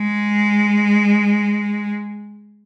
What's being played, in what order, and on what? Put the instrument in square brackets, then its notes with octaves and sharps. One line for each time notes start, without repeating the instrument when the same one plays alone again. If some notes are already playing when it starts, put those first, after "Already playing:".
Already playing: [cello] G#3